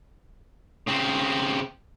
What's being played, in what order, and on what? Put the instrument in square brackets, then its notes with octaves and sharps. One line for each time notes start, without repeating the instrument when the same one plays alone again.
[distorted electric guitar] C#3 C4